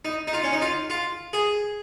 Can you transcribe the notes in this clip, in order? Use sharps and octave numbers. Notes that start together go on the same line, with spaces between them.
D#4
D#4
F4
C#4
D#4
F4
F4
G#4